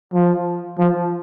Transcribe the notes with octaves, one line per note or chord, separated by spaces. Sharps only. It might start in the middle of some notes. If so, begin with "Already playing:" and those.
F3
F3